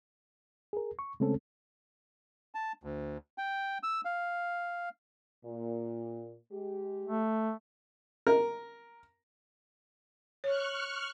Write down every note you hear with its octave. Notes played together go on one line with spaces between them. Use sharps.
G#4 A#4
C#6
C#3 G#3 A3 C4 C#4 A4
A5
D2
G5
E6
F5
A#2
G#3 G4
A3
A#4
C#5 C#6 F6 F#6